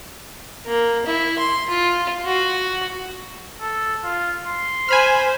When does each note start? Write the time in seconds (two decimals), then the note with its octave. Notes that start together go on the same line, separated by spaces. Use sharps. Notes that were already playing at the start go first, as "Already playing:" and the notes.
0.66 A#3
1.06 E4
1.38 C6
1.69 F4
2.26 F#4
3.62 A4
4.03 F4
4.47 C6
4.89 C5 G#5 B5 F6